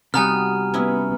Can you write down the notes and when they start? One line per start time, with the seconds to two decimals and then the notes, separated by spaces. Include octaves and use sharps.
0.14 C3 G3 B3 D#4 F#4 G#5 A#5 F6
0.74 B3 C#4 E4 D#5